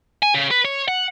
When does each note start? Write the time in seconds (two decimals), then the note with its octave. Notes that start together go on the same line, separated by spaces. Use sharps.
0.22 G#5
0.34 C#3
0.51 B4
0.65 C#5
0.88 F#5